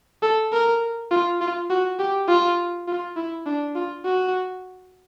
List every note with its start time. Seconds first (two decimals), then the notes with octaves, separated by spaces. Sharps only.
0.22 A4
0.52 A#4
1.11 F4
1.41 F4
1.70 F#4
1.99 G4
2.28 F4
2.88 F4
3.16 E4
3.46 D4
3.75 F4
4.05 F#4